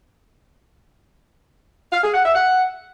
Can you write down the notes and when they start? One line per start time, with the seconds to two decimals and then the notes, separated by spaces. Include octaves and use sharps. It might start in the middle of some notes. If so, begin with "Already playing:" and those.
1.92 F5
2.03 G#4
2.14 F#5
2.24 E5
2.35 F#5